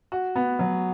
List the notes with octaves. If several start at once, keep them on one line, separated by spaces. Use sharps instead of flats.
F#4
B3
F#3